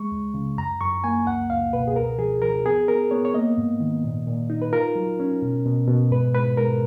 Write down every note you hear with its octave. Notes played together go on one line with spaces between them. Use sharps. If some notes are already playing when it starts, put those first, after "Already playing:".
Already playing: G#3 C#6
C#2
C#3
F#2 A#5
F#2 C#6
A#3 G#5
C#2 F#5
C#2 F5
B2 B4
G#4
C#2 A#4
F3 G#4
F3 A#4
B3 G#4
B3 A#4
B3 C#5
C#5
A#3 D#5
G#2
D#3
A#2
A#2
D#4
B4
F4 A#4
F#3
C#4
B2
B2
B2
G#2 B4
G#2 B4
G#2 A#4